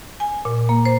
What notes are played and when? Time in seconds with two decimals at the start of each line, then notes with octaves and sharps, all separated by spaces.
0.20 G#5
0.45 A#2
0.69 A#3
0.86 C5